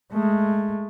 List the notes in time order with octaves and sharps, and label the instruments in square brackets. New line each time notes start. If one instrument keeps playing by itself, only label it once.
[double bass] G#3 A3